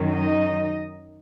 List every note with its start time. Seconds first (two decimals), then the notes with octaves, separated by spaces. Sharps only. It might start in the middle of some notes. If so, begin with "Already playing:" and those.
Already playing: F#2 D#3 F#3
0.10 D#4 D#5